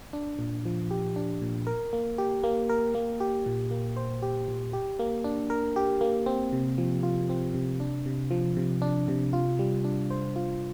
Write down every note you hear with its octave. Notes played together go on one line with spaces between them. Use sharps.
D4
A#2
F3
G4
D4
A#2
A#4
A#3
G4
A#3
A#4
A#3
G4
A#2
A#3
C5
G4
A#2
G4
A#3
D4
A#4
G4
A#3
C4
C3
F3
F4
C4
C3
D4
C3
F3
C3
D4
C3
F4
G3
D4
C5
F4